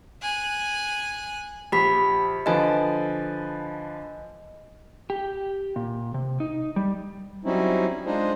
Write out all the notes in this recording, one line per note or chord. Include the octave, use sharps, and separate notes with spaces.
G#5 F#6
A#1 G4 B5 B6
D3 F3 B4 D#5 G#5
G4
A#2
C3
D#4
G3
F#3 G3 C4 C#4 D#4 E4
G#3 D4 D#4 F4 G#4 C5